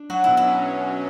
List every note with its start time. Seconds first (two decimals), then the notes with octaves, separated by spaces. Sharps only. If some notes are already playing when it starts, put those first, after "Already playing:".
Already playing: D4
0.10 F#3 F#4
0.24 B2 E4
0.37 E4
0.47 C#4